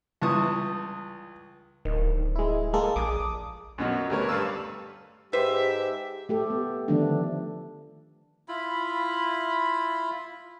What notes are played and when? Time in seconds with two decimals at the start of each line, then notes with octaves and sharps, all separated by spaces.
0.22 C#2 G2 E3 A5 C#6 D#6
1.85 D1 D#3
2.36 G#3 E4
2.73 G#3 A#3 A4
2.96 A#1 D6 D#6
3.78 F#2 B2 F#3
4.10 D2 G3 A#4 B4 C#5
4.29 G2 B4 F5 A5 E6
5.33 G#2 G4 B4 C5 E5
6.29 A3 G4 A4
6.50 B3
6.88 D3 D#3 F3 A3 B3 D4
8.48 E4 F4 B5